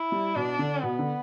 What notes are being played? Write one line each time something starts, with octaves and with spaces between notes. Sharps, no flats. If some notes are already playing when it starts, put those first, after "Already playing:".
Already playing: E4
G3
B2 D4
D3
B2 B3
D3